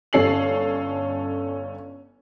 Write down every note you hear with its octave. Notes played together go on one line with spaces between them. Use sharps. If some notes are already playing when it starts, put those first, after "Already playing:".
G1 C#4 A4 C7 F#7